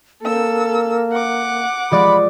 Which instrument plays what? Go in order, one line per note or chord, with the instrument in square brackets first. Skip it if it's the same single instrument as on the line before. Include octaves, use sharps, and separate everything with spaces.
[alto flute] A#3 [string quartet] A4 E6
[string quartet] F#5 D6
[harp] F3 G#3 D5 [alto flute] B5